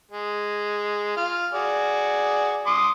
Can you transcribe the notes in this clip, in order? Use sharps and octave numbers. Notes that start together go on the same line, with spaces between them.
G#3
F4 F6
F#4 G#4 D5
C6 D6 D#6